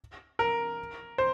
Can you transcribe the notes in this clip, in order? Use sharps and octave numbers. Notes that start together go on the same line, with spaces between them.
A#4
C5